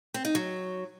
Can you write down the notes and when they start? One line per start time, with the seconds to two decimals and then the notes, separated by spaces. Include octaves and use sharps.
0.14 C4
0.25 D#4
0.35 F#3